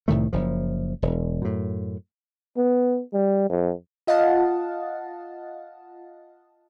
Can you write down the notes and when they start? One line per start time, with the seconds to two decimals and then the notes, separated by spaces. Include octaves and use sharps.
0.08 C2 A2 D#3 A3
0.33 F#1 F3
1.02 E1
1.42 F#2 A2
2.57 B3
3.13 G3
3.50 F2
4.07 F4 D#5 F5 F#5 A5